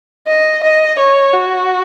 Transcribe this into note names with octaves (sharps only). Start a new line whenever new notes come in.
D#5
D#5
C#5
F#4